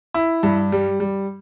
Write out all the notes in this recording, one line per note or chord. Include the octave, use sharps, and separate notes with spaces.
E4
G2
G3
G3